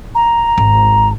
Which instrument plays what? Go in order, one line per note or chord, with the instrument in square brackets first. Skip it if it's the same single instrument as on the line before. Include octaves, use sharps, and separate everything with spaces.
[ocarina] A#5
[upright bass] G#1